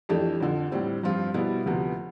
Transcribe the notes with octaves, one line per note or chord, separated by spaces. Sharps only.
F2 E3 A3 D4 G4
F2 D3 F3
A2 G3 C4
G2 F3 C4 F4
B2 G3 B3 E4
D2 C3 F3 B3